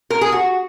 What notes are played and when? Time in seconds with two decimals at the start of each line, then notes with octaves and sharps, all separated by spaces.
0.10 A#4
0.21 G#4
0.32 F#4